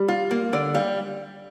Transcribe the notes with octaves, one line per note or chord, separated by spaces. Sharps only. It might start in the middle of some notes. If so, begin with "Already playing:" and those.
Already playing: G3
F4
A#3
D3 D5
G3 F5